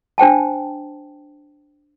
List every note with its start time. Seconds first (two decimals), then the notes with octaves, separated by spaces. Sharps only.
0.18 D4 C5 G5 A5